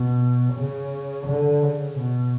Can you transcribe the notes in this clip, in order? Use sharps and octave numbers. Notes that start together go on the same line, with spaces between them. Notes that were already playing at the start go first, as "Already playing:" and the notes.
Already playing: B2
C#3
D3
C#3
B2